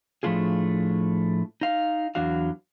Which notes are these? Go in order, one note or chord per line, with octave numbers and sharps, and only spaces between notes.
A2 F3 A3 D4 F4 G#4
D#4 F5
E2 F#3 D4 F#4 F5